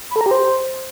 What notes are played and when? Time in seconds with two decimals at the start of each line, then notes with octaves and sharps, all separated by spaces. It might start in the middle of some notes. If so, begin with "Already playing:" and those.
0.11 B5
0.16 A4
0.21 A#5
0.26 G4
0.31 C5